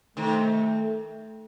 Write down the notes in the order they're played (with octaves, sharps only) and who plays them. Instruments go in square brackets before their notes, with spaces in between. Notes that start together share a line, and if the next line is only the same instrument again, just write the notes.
[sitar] C3 D#3 [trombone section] A3